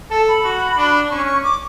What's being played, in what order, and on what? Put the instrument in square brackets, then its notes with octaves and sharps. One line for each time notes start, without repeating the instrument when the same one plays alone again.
[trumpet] A4 [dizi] A5
[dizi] B5
[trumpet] F#4
D4
[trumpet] C#4 [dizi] C#6
[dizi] C#6
D6